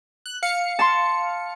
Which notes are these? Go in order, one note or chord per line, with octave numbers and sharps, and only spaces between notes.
F#6
F5 C#7
A5 C6